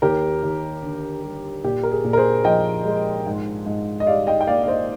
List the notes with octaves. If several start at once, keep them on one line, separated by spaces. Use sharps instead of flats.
D#2 G4 A#4
D#2
D3
G3
A#2 G4
A#4
G#4
A#2
A#4
G#4 C5
F3 D#5 G5
G#3
G#2
G#2
D#5
G3 D5 F5
D#5 G5
G5
A#3 D5 F5
F5
C5 D#5